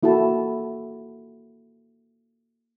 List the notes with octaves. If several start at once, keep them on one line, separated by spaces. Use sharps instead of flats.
A#3 E4 F#4 A4 A5